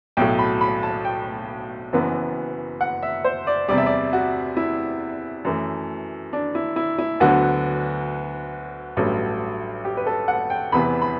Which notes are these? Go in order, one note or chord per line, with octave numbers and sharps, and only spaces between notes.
B1 A2 F#3 A3 G5
B5
B5
A5
G5
F#1 F#2 E3 B3
F#5
E5
C5
D5
E2 C3 G3 D5
E5
D5
F#4
E4
F#2 E3 A3
D4
E4
E4
E4
D2 D3 F#3 B3 F#4
A1 G2 F#3 A3
G4
B4
A4
F#5
G5
E2 C3 E3 B3 B5
B5